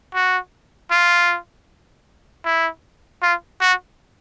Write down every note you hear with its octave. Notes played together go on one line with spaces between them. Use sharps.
F#4
F4
E4
F4
F#4